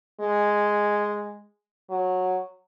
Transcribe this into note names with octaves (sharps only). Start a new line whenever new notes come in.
G#3
F#3